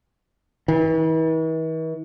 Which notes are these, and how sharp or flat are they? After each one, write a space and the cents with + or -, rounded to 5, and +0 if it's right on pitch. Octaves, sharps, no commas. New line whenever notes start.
E3 -45